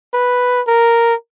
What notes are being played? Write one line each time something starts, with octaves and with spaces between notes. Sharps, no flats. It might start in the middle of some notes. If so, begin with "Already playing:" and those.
B4
A#4